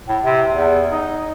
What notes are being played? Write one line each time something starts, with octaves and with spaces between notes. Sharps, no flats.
A2
C3
E2
D#4